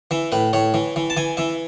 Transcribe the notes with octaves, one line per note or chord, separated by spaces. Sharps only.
E3 E5
A2 B4
A2 C#5
E3
E3
A5
E3 G#5
E3 E5